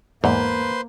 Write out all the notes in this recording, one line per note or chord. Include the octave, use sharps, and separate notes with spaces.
E2 G#2 A#3 B4 C5 C6